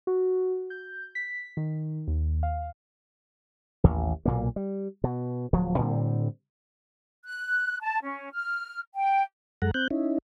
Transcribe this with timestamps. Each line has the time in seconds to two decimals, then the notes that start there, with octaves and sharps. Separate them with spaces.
0.07 F#4
0.70 G6
1.15 B6
1.57 D#3
2.08 D#2
2.43 F5
3.84 A1 D#2
4.25 B1 A#2 A#3
4.56 G3
5.04 B2
5.53 D1 F3 F#3
5.78 A2 D3 G3 C4
7.24 F#6
7.81 A5
8.02 C#4
8.33 F6
8.95 G5
9.62 F#2 G#3 A4 F#5 A#5
9.74 C4 F#6 G6
9.91 C#4 D#4 E4